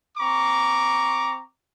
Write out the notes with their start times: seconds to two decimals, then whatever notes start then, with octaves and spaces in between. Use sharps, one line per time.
0.18 C4 A#5 C#6 D6